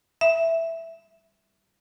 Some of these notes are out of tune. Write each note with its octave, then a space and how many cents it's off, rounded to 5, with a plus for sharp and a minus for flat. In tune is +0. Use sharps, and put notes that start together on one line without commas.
E5 +0